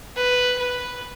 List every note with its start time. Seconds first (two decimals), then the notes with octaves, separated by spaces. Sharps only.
0.17 B4
0.58 B4